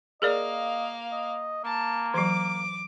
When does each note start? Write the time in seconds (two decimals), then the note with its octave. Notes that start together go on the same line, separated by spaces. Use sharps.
0.22 A#3 G#4 A#4 D5 D#5 F5
1.12 D#5
1.64 A#3 A5
2.14 E3 F#3 D6